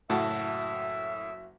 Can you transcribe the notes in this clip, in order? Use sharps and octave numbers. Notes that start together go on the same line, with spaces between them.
F#1 A2 F#4 E5 A5